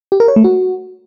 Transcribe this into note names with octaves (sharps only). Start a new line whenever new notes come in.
G4
A#4
C#5
A3
F#4